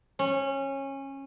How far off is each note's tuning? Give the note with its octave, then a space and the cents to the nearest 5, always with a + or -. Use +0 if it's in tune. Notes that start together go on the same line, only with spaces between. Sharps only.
C#4 -20